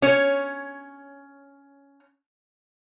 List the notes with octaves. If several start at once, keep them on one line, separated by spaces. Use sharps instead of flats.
C#4 C#5